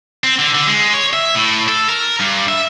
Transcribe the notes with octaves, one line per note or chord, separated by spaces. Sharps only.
C4
D3
D3
G#3
C#5
E5
A2
A4
A#4
G2
E5